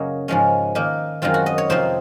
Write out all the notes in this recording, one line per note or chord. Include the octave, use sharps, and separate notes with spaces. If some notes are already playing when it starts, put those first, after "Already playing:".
Already playing: F#2 C#3 F#3 A#3 C#5 D#5
G#2 F3 G#3 C#4
D#3 A#3 D#4
F#2 D#3 G#3 C4 F4
F#4
D#5
C#5
F2 C3 F3 C4 D#4 C5